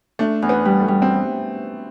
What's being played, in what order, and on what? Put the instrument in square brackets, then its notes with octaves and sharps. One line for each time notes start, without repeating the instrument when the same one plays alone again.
[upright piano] A3 [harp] D4
[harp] E2
[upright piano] B3
[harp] G3
[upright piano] A3
[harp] G3
[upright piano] C4